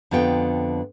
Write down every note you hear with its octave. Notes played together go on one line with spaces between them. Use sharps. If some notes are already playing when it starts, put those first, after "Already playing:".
F2 D3 B3 F4 G5